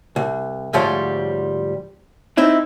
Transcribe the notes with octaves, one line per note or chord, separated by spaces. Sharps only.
C2
D2 G#2 F3 G3 C#5
C4 D#4 E4